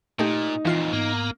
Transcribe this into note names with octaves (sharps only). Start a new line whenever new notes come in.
A#2 A3 D#4 G4
F2 A#2 E3 F4 C7
G#2 A#3 B3 A#5